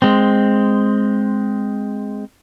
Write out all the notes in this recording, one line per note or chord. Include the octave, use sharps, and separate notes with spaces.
G#3 C4